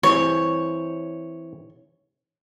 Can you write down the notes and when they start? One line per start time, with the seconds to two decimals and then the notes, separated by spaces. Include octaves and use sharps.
0.03 E3 C4 E4 C#5